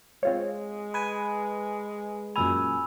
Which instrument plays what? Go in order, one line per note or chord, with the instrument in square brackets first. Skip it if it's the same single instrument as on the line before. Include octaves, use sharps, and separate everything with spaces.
[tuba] G#3 [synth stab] C4 F4 C#5
[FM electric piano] B4 G#5
[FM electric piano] F#2 A#2 G#5 [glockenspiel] B5 E6